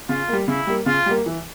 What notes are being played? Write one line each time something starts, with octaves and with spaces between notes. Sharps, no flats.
C#3 F4
G3 A#3
C#3 E4
G3 A#3
C#3 F4
G3 A#3
E3